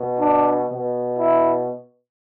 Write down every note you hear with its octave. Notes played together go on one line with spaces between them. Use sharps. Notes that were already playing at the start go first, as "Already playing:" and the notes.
Already playing: B2
D4
B2
E4